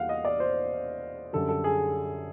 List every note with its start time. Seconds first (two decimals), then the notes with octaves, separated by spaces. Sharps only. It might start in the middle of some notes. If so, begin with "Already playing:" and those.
Already playing: E2 G3 A#3 F5 F#5
0.09 D#5
0.25 D5
0.40 C5
1.33 F#2 D3 G3 A4
1.49 A4
1.64 G#4